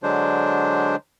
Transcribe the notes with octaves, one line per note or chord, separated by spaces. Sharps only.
D3 F#3 G#3 D4 C5